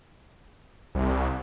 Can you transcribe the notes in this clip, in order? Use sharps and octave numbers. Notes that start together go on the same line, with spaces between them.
C2